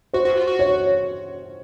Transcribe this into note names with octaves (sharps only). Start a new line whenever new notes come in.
F#4 C5
F#4
F4
F#4
C#5